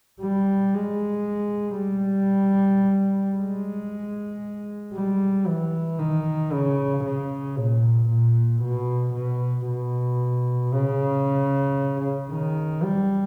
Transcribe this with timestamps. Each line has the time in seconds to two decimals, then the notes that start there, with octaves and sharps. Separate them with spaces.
0.22 G3
0.74 G#3
1.80 G3
3.37 G#3
4.94 G3
5.47 E3
5.99 D#3
6.52 C#3
7.05 C#3
7.58 A#2
8.09 A#2
8.63 B2
9.14 B2
9.67 B2
10.73 C#3
12.30 D#3
12.83 G3